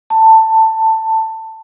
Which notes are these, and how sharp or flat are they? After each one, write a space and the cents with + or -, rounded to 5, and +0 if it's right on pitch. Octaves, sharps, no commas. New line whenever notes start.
A5 +15